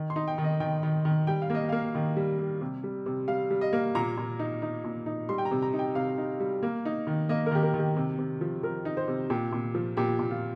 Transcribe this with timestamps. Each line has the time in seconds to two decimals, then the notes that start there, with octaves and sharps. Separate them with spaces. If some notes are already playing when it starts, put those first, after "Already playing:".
Already playing: D#3
0.10 C6
0.16 D#4
0.28 G5
0.38 D#3
0.44 D#5
0.60 D#3 G5
0.83 D#3
1.05 D#3
1.27 G3 G5
1.42 F5
1.50 A#3 D#5
1.69 A#3 F5
1.95 D#3
2.17 G3
2.39 G3
2.61 C3
2.84 G3
3.06 C3
3.28 G3 F5
3.50 G3
3.61 D#5
3.73 A#3
3.95 A#2 A#5
4.17 A#2
4.39 D#4
4.62 D#4
4.84 A#2
5.06 D#4
5.29 G3 C6
5.38 G5
5.45 A#5
5.51 C3
5.62 A#5
5.73 D#4
5.79 G5
5.95 C3 F5
6.18 D#4
6.40 G3
6.63 A#3
6.85 D#4
7.07 D#3
7.29 A#3 D#5
7.46 A#4
7.51 D#3 G4
7.63 A#4
7.74 D#3
7.79 G4
7.96 C3
8.18 C3
8.41 F3
8.63 F3 A#4
8.85 D#4
8.97 C5
9.08 C3
9.30 A#2 G4
9.52 A#2
9.74 F3
9.97 A#2 G4
10.19 A#2
10.31 F4